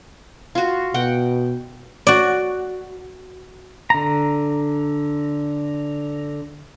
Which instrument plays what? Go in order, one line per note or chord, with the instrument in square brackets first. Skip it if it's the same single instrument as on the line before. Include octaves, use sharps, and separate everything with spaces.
[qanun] F4 F#4
[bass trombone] B2 [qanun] F#5 G5
[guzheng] F#4 D5
[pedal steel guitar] D3 A#5